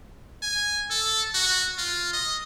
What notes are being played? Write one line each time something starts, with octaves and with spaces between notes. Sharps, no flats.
G#5
A4
F#4
F4
D#5